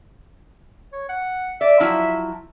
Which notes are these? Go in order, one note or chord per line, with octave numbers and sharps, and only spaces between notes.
C#5
F#5
D5 E5
F3 F#3 E4